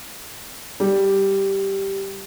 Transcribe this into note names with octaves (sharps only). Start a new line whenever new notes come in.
G3